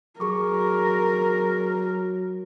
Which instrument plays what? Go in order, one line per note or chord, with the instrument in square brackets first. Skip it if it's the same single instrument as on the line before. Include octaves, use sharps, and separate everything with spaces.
[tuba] F#3 [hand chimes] G#4 C#6 D6 [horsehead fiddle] A#4